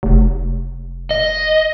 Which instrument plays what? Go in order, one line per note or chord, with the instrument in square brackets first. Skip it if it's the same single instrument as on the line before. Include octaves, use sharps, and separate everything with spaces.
[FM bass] F1
[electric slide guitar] D#5